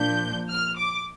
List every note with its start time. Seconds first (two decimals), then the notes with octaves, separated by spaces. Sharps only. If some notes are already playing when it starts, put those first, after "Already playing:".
Already playing: A#2 F3 D4 G6
0.50 F6
0.78 D6